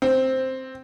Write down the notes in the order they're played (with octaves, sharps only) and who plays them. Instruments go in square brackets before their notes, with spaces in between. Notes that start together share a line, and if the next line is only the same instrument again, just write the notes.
[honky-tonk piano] C4